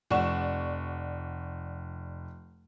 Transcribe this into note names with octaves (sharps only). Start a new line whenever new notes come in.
F1 D5 F#5 C#6 E7